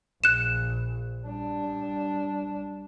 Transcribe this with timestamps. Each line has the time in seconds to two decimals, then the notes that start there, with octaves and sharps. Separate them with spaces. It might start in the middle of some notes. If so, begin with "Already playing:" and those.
0.24 A#1 F#6 E7
1.23 G3 D4